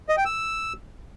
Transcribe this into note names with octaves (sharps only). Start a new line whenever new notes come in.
D#5
G5
E6